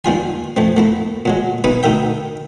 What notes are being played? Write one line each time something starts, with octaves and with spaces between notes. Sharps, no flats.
D#2 G3 F4 G#5
F2 A3 C4
A3 A#3 E4
A#2 F#3 G#3
B1 D#4 B4 B5
D2 D#3 A#4 E5 G5